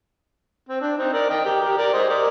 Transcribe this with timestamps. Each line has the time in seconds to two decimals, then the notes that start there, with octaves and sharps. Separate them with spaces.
0.69 C4
0.81 D4
0.97 C4 D#4
1.13 A#4 D5
1.29 D#5 G5
1.45 G4 A#4
1.61 G4 A#4
1.77 A#4 D5
1.94 C5 D#5
2.10 A#4 D5